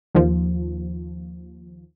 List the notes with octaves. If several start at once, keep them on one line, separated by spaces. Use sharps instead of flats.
D#2 F3